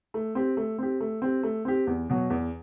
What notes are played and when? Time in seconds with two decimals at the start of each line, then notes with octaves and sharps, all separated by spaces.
0.14 A3
0.35 C4 G4
0.57 A3
0.78 C4 G4
1.00 A3
1.22 C4 G4
1.43 A3
1.65 C4 G4
1.87 E2
2.10 B2 F#3
2.30 E2